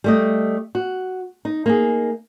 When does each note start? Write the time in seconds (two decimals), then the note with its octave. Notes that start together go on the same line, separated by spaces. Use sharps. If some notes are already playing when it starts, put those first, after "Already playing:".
0.04 G3 A3 D#5
0.75 F#4
1.45 D#4
1.66 A#3 D#4 G#4